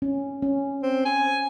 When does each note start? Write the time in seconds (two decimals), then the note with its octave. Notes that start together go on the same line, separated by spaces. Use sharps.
0.02 C#4
0.42 C#4
0.83 C4
1.05 G#5